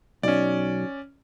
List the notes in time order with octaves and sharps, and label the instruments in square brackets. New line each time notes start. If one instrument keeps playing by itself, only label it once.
[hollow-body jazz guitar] B1 [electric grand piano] C#4 D5